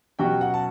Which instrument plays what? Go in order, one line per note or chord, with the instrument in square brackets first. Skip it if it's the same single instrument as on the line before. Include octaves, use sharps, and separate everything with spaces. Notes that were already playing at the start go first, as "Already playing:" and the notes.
[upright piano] B2 F#3 C#4 F#4 [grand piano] G4 G5
[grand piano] F#5
A5